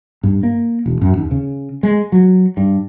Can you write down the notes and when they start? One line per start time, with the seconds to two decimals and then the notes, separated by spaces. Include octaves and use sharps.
0.23 G2
0.43 A#3
0.86 E1
1.01 F#2
1.18 D#2
1.31 C#3
1.83 G#3
2.12 F#3
2.57 G2